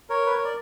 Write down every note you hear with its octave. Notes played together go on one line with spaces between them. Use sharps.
A#4 C#5
B4
C#5
D5